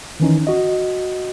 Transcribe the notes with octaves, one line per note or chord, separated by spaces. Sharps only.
D#3 E3 C#4 D#4
F#4 D#5